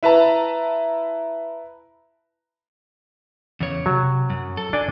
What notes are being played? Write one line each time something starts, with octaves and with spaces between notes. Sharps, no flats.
E4 B4 A5 A#5
E2 C#3 C#5
C3 F#3
F#2
A4
D4 D5 G#5